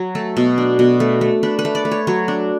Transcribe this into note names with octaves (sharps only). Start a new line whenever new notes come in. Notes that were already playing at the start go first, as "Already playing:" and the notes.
Already playing: F#3
A3 A4
B2
D4
B2
A3
A3
D4 B4
B4
A3
D5
A3
C#5
F#3 C#5
D4